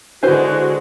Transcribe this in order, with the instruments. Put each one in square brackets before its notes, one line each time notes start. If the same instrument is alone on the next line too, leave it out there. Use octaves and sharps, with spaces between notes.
[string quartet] D3 G#3 [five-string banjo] E4 B4 C5 [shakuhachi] F#4